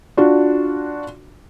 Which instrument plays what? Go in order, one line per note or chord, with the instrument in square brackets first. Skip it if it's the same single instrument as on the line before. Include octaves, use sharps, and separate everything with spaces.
[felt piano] D4 F4 F#4